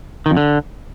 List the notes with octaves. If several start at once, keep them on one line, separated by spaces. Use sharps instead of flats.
D#3
F2
D3